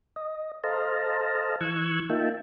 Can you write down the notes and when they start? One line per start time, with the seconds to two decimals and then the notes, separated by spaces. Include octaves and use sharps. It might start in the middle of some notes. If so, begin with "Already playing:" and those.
0.16 D#5
0.64 A4 C5 D#5 F5 A5 A#5
1.61 E3 C#6 E6 F#6 G#6
2.10 A#3 D#4 F4 E5 G5 A5